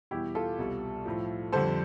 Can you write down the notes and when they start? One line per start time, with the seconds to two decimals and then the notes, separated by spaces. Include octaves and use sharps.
0.11 E2 B2 G3 E4 G4
0.35 F4 A4
0.59 C2 B2 G3
1.05 A2 F3
1.52 F2 D3 G3 A4 C5